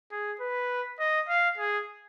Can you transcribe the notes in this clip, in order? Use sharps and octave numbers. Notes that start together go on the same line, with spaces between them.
G#4
B4
D#5
F5
G#4